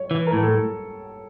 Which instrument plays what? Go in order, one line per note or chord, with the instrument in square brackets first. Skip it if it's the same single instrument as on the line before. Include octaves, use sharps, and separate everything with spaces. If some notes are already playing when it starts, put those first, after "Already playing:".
Already playing: [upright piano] C#5
[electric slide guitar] E3
[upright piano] A#4
[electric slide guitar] A2
[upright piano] A4